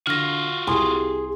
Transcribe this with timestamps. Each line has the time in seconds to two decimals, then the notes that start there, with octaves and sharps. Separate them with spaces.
0.07 D3 F4 F#4 F6 A#6
0.67 C2 G4 G#4 C6